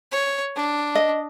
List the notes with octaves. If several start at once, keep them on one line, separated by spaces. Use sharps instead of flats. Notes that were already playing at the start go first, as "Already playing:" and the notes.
C#5
D4
D#5